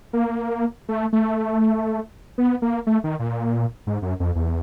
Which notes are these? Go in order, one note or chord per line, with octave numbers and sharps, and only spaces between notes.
A#3
A3
A3
B3
A#3
A3
D#3
A#2
G#2
F#2
F2
E2